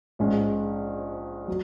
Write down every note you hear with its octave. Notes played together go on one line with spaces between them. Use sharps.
A#1 G#2 G#3 C#4
F#3